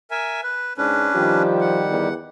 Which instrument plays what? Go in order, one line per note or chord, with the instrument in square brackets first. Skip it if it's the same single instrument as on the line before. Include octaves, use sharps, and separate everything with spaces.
[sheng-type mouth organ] A#4 E5 G#5
B4
[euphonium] G#2 [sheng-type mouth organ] C#4 D4 B4
[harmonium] D#3 G3 G4 [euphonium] F3
[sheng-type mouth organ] F#5
[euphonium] E2